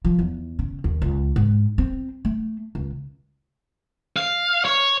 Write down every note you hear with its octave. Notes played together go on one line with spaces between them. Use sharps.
F3
E2
C#3
D#2
C#2
G#2
C4
A3
C#2
F5
C#5